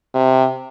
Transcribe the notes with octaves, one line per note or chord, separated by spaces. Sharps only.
C3